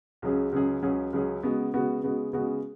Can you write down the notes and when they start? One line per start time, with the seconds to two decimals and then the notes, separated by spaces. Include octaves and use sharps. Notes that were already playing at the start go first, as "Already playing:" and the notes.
0.22 C#2 C#3 F#3 C#4 G#4
0.52 C#2 C#3 F#3 C#4 G#4
0.82 C#2 C#3 F#3 C#4 G#4
1.13 C#2 C#3 F#3 C#4 G#4
1.43 C#3 G#3 B3 F#4
1.74 C#3 G#3 B3 F#4
2.03 C#3 G#3 B3 F#4
2.33 C#3 G#3 B3 F#4